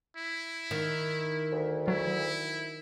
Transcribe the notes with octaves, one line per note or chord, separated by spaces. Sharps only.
E4
D#3
D2
F#3 E4